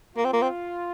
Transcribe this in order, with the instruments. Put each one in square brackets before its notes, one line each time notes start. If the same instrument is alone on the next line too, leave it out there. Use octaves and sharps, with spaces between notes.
[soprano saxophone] A#3 [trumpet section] F4
[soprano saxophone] C4
A#3
C4